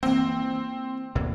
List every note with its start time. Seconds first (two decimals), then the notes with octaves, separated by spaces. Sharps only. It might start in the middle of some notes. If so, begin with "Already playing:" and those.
0.03 E3 A#3 C4
1.15 D2 A#2 E3